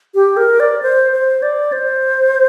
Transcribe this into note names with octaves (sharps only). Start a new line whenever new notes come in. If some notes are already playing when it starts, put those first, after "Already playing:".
G4
A#4
D5
C5
C5
D5
C5